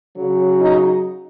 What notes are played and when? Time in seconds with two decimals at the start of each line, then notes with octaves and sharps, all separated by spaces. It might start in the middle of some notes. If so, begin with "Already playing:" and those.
0.16 C#3 F#3
0.60 D#4